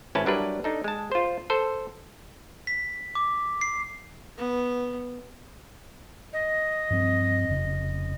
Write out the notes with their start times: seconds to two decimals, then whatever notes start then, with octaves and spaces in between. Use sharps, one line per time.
0.15 G#1 C#4 E4 B4 A5
0.26 F#3 G3 D4 E4 A#4 B4
0.64 D4 D#4 A4
0.84 G#3 A5
1.12 F4 C5
1.50 A4 C5
2.67 B6
3.15 D6
3.61 C7
4.38 B3
6.33 D#5
6.90 G2 F3 C4
7.48 F1 C#3